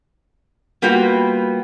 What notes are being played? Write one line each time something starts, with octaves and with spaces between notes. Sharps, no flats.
G3 A#3 B3 F4 F#4 B4